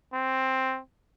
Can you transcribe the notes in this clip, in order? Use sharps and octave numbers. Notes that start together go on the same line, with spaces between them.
C4